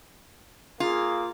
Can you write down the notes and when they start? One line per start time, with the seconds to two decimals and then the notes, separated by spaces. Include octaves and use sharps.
0.80 A#3 F4 G#4